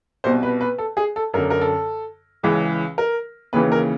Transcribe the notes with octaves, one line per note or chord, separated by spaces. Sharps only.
C2 B2 C5
B4
B4
A4
G#4
A4
F#2 D3 A#4
A#4
A4
C#2 C#3 E3
A#4
D#2 C#3 E3 B4
A#4